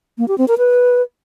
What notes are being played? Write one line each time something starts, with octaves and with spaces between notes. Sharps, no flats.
A#3
G4
C4
A#4
B4